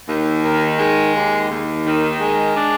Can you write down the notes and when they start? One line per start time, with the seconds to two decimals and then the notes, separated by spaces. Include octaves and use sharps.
0.08 D#2
0.44 D#3
0.79 G#3
1.14 D#2
1.51 D#2
1.86 D#3
2.20 G#3
2.57 D4